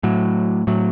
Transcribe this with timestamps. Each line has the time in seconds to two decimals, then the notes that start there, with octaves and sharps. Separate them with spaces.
0.03 A2 F#3
0.67 A2 F#3